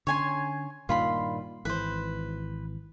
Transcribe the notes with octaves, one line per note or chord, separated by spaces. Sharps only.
D3 C#4 C#5 G#5 C6
G2 A#2 D#3 F4 B5 C6
G#1 E3 B4 C5